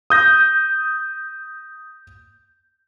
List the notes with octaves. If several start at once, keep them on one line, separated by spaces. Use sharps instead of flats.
D#6 G6 A#6